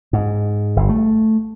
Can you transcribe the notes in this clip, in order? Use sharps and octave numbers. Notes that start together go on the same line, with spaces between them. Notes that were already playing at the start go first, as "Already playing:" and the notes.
G#2
G1
A3